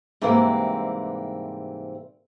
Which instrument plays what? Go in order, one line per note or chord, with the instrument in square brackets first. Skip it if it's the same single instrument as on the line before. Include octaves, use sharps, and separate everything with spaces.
[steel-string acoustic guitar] G#2 C3 E3 G3 A#3 C4